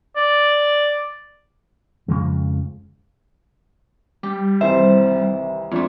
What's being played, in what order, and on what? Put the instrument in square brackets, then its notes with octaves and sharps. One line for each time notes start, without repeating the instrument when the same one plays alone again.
[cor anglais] D5
[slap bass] F2 C#3 F3 G#3
[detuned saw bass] G3 [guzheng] G4
[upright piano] C2 D#3 E3 [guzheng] C5 [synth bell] E5
[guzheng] F2 A3 [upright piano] F3 D4